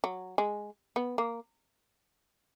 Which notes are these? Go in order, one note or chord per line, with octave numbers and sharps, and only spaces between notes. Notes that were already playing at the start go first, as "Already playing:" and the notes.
F#3
G#3
B3
A#3